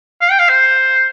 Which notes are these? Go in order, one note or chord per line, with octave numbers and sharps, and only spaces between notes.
F5
G5
F5
C5